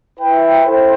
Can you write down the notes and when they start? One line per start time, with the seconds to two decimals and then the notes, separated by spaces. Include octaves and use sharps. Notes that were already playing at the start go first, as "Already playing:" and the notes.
0.19 E4 B4 E5 G5
0.62 E4 A4 C5 G5